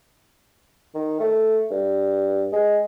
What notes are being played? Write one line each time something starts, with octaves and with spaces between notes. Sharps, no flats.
D#3
A3
G2
G#3